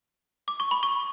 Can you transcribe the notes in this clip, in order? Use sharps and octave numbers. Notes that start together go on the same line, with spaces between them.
D6
C#6
B5
C#6